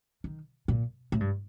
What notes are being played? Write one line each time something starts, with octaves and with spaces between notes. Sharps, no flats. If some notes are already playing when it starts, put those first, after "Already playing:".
D#3
A#2
A2
G2